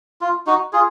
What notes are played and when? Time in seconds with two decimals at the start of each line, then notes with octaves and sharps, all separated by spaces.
0.21 F4
0.46 D#4 F#4
0.73 F4 G#4